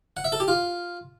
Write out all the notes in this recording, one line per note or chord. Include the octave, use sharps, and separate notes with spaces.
F#5
E5
A4
G4
F4